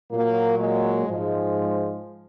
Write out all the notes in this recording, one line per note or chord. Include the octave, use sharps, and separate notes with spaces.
A#2 F#3 A#3
G#3
G#2 F3 G#3